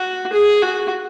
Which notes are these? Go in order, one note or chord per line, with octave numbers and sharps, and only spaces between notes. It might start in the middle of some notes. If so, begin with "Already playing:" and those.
Already playing: F#4
G#4
F#4